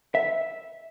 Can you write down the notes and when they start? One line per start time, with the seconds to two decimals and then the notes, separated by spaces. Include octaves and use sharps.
0.15 E5